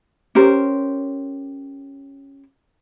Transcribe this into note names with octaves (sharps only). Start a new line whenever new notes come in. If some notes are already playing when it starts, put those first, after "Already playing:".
C#4 G4 A#4 C5